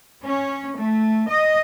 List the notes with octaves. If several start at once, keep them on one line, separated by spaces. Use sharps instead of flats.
C#4
A3
D#5